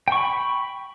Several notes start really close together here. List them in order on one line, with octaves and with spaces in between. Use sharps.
G5 C#6 B5